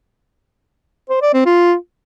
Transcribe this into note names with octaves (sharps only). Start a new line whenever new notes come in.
C5
D5
C4
F4